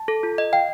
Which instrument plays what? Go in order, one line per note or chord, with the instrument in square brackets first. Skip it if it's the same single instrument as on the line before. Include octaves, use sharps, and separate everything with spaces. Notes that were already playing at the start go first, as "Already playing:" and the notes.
Already playing: [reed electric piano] A5
[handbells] A4
F4
D#5
[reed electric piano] F5 [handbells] G5